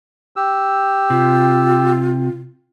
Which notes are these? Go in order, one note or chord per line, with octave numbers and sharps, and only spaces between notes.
G4 E6
C3 F4